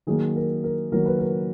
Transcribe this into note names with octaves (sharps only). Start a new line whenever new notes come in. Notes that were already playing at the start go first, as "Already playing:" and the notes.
D#3 F#3 A#3 G#4
A#4
A#4
D#3 F#3 A#3 A#4
B4
A#4